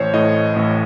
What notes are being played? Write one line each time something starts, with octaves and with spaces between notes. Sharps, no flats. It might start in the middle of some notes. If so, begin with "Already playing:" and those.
Already playing: A1 C5 C#5
A2 D#5
A1